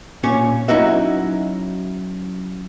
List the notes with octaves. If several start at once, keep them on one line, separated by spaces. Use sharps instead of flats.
A#2 C#4 C#5
F#3 C#4 D#4 E4 F#4 E5